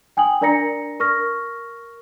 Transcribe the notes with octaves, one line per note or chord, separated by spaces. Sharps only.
G5 G#5 D#6 F#7
D4 A#4 D5 A#5 A#6 C#7
A#4 C#6 F6 A#6